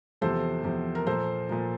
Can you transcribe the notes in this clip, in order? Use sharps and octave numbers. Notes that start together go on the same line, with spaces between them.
E2 C3 F3 A4 C5
E2 C3 F3
A#4
A#2 F3 A#3 A4 C5
A#2 F3 A#3